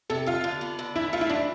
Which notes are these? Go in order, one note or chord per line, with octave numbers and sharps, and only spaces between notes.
C3 A4
D3 F4
D3
B3
D3
E3 E4
A3 F4
E4
E3 D4